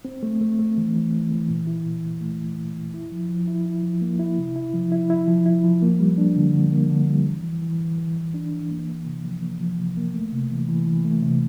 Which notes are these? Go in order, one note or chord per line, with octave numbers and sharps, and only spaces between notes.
C4
A3
A3
A3
E3
E3
E3
E3
A#2
E4
A#2
A#2
A3
A#2
A#2
A#2
E4
F3
F3
E4
E4
F3
A#3
E4
C3
E4
F3
E4
E4
F3
E4
F3
A#3
G3
D4
D3
D3
A#3
D3
G3
E3
E3
E3
E3
E3
E3
D4
E3
A#3
A#3
C3
F3
A#3
F3
C3
A#3
A3
C3
E3
E3
E3
A3
C3